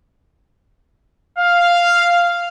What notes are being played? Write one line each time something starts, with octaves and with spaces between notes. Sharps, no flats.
F5